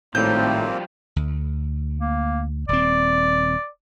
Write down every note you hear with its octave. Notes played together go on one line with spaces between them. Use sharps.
G#1 A2 F3 G3 A#3 C4 G6
D2
A#3
D#1 C4 D5